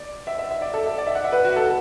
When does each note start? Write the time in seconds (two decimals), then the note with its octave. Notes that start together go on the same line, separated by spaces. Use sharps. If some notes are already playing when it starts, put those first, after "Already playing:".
Already playing: D5
0.27 E5
0.38 E5
0.51 E5
0.62 D5
0.74 A4
0.85 E5
0.98 D5
1.06 E5
1.15 F#5
1.24 E5
1.32 B4
1.45 F#4
1.56 A4